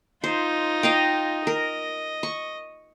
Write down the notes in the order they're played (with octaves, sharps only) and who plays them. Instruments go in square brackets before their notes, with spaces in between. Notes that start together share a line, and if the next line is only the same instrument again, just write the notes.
[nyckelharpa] D#4 F4 [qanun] C5
[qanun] D#5 F5 G5
[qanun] A#4 [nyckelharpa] D#5
[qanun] C#6